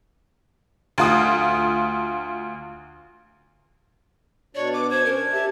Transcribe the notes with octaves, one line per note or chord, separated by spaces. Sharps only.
D2 F4 D#6
B2 D4 C#5 D5
B4 D6
C5 G#6
C#4 A#4
D4
G4 E5 A5